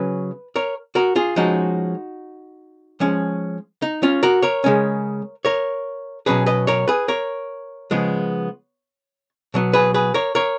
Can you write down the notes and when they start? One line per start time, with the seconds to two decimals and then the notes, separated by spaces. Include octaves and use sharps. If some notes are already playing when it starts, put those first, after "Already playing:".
Already playing: C#3 F#3 C#4 B4
0.56 A#4 C#5
0.95 F#4 A#4
1.16 F4 G#4
1.36 F3 G#3 C#4 D#4 F#4
3.00 F3 G#3 C#4
3.82 D#4
4.03 C#4 F4
4.23 F#4 A#4
4.42 A#4 C#5
4.64 C#3 G#3 C#4
5.45 A#4 C#5
6.26 B2 F#3 C#4 G#4 B4
6.46 B4 D#5
6.67 A#4 C#5
6.88 G#4 B4
7.08 A#4 C#5
7.91 C#3 F3 G#3 B3
9.54 B2 F#3 B3
9.73 G#4 B4
9.94 G#4 B4
10.14 A#4 C#5
10.35 A#4 C#5